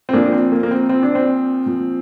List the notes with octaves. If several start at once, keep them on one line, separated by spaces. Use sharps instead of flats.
C4
A#2 F3 A#3 D4
C4
A#3
A#3
C4
C4
D4
C4
A#2 F3